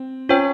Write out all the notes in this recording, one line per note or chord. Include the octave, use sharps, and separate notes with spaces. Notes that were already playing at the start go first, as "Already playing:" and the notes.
Already playing: C4
C#4 F4 C5 C#5 G5